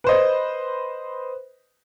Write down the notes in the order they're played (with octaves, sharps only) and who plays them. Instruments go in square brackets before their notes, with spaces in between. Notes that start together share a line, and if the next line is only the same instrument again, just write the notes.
[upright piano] B4 C5 D#5